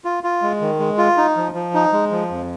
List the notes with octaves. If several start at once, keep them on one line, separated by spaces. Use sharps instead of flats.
F4
F4
G#3
D#3
G#3
F4
D#4
F3
F3
D#4
G#3
F3
F2